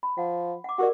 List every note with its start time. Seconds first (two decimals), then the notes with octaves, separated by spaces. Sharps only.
0.03 B5
0.18 F3 F#5
0.64 F#5 D6
0.78 F#4 G4 A#4 D5